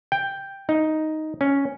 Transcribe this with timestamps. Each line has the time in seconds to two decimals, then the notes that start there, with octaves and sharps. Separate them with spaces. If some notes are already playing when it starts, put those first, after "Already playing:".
0.12 G5
0.69 D#4
1.41 C#4